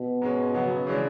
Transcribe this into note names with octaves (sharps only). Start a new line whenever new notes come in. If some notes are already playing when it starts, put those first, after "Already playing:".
Already playing: B2
G#2 G#3 C#4
C#3 F#3 B3
C#3 E3 G#3 D4